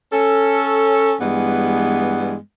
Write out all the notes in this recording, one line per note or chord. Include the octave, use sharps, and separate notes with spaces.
C#4 A4
G2 E3 G#3 B3